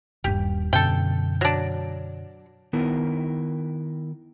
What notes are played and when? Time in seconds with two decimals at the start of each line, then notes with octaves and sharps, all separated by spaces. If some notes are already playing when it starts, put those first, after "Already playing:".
0.24 D#1 G2 G4
0.73 F#2 B2 D3 A4 G5
1.41 F#3 D4
2.73 D#3 B3 E4 A#4